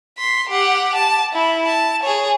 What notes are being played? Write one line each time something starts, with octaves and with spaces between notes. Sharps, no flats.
C6 B6
G4 F#5
A5
E4
A5
G#4 C#5